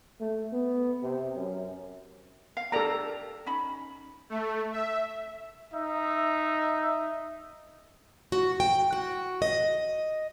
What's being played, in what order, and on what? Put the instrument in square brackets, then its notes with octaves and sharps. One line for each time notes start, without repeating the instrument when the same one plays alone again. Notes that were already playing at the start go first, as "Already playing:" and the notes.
[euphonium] A3
B3
C3
F#2
[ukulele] F5
[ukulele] G4 A#4 D5 [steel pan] A4 A#5
[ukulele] C#4 D#4 B5
[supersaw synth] A3
E5
[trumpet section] D#4 E5
[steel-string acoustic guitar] F#4
G5
F#4
D#5